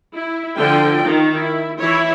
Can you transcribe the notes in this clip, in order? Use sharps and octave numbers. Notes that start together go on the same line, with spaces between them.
E4
D3 F3 F4 G5
D#3
E4
E3 E4 C#5